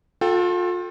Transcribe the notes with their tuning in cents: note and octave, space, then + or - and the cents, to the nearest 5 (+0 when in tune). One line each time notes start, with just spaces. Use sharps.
F4 +35 A4 +0 G5 +0